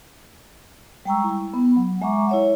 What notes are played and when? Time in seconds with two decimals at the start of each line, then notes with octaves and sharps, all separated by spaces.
1.05 G3 G#3 G5 A#5 C#6 E6
1.24 E4
1.54 B3
1.76 F#3
2.02 G#3 E5 F#5 A#5 C#6 D6
2.29 E4 C#5 E5